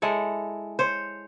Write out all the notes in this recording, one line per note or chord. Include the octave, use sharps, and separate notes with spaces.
G#3 E4 A4 C#5
C5 C#5